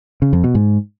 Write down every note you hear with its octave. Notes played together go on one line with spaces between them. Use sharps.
C#3
F2
B2
G#2